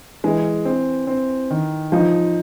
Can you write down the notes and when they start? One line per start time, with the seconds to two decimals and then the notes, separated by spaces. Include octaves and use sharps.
0.24 E3 G#3
0.65 C4
1.07 C4
1.51 D#3
1.92 F3 D#4